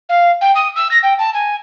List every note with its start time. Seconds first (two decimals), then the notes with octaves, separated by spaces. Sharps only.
0.09 F5
0.41 G5
0.55 D#6
0.75 E6
0.91 A#6
1.02 G5
1.18 A5
1.34 G#5